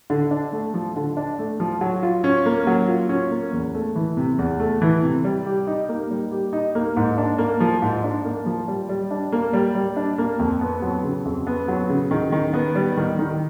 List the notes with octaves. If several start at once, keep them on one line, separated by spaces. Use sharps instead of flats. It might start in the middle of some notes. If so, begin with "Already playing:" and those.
D3
D4
A3
F3
D3
D4
A3
F3
F#3
F4
C#4
A#3
F#3
F4
C#4
A#3
E2
A3
E3
C3
E2
A3
E3
C3
G3
G4
D#4
A#3
G3
G4
D#4
A#3
G#2
D4
A#3
F3
G#2
D4
A#3
F3
G3
G3
D4
A#3
G3
G3
D4
A#3
F2
B3
F#3
C#3
F2
B3
F#3
C#3
D#3
D#3
B3
G3
D#3
D#3